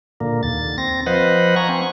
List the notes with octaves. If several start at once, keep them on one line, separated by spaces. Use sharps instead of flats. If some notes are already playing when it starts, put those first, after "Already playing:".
A#2 D3 A#3
D#2 A6
C4 A#6
F3 B4 C5 D#5 F#5
G#5 A#5 C#6
C4 C#6